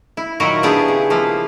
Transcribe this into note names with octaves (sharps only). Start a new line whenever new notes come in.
E4
A#2 D#3 F#3 E4 F#4 A#4
B3 D4 E4 G4 G#4
C#3
F3 A#3 E4